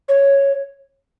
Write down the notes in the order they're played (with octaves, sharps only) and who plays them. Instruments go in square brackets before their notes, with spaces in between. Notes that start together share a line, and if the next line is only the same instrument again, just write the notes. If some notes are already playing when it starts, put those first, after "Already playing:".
[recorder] C#5